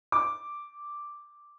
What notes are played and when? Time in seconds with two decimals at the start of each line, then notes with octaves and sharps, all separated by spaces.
0.12 D6